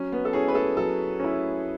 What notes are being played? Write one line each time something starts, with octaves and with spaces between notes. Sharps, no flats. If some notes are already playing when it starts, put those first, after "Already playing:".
Already playing: F#3 C#4
B3
A4
C#4 E4 G#4
B4
A4
F#3 A4
C#4 E4